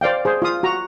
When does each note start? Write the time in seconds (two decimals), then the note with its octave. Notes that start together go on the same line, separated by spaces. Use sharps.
0.01 C5 D5 F5 G5
0.25 G#4 C5
0.42 F4 F5 D#6
0.63 F#4 A#5